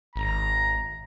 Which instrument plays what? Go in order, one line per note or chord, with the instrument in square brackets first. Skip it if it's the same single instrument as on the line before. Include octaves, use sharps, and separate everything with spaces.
[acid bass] G#1 [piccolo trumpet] A#5